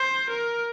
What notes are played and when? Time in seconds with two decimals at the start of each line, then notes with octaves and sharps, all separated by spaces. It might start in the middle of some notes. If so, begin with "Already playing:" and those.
Already playing: C5
0.30 A#4